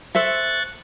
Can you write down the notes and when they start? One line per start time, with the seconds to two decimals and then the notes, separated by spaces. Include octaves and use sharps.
0.15 A4 C5 E5 C#6 F#6 A6